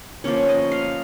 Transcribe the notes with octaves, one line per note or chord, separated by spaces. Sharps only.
F3 A#3 C#4 C#5
D#5
F5